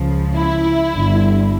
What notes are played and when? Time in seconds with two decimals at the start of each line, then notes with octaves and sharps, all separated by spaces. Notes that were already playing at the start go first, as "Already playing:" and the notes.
Already playing: C#2 C#3 F3
0.36 E4
0.91 G1 G2 D3